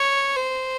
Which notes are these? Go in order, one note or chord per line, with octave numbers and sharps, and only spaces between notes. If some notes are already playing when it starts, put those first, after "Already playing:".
Already playing: C#5
C5